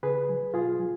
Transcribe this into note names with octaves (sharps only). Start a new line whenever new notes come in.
C#3 G#4 B4
F#3
B2 F4 G#4
F#3